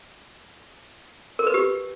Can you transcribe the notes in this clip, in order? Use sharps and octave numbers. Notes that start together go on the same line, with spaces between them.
A#4
B4
G4